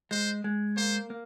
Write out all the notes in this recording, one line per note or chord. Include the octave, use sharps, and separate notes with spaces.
G#3 C5
G#3
A#3 C5
A#3